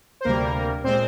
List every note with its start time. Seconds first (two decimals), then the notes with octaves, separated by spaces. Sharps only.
0.21 C5
0.25 D2 C3 G3 A#3 A#4
0.84 A#2 G#3 C4 C5